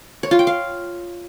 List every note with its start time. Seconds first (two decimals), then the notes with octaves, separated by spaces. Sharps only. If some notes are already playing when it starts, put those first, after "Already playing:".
0.23 C#5
0.31 F4
0.39 G5
0.47 F5